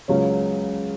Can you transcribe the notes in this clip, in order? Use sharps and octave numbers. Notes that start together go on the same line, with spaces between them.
C#2 C#3 F#3 C#4